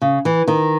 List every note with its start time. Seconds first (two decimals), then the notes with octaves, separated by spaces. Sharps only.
0.02 C#3
0.25 E3
0.47 D#3